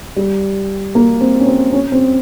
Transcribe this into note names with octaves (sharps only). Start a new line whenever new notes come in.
G3
A#3
C4
C#4
C4
C#4
C4